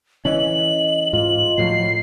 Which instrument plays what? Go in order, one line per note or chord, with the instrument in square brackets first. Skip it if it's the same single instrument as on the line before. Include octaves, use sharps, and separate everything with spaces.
[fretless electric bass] E3 C#4 [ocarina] D#5 [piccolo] F#7
[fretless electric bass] G#2 [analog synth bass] F4 [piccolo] F#7
[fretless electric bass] A2 F3 F#3 [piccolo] C7